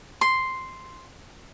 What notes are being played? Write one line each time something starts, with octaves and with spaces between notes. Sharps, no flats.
C6